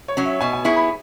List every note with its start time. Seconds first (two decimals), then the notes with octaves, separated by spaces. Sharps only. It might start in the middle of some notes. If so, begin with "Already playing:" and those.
0.08 C#5
0.17 F#3 C#4
0.25 E5
0.41 B2 G#5
0.53 G#5
0.65 B3 E4 G#4 C#6
0.76 B5